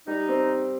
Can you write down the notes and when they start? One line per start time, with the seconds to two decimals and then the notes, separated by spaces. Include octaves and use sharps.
0.07 G3 D#4
0.29 C4